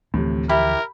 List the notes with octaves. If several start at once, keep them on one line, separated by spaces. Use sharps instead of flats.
D2 A2 C3 E3 F3
E4 G4 A#4